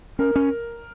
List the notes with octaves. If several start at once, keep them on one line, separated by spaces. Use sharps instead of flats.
C#4 A#4
C#4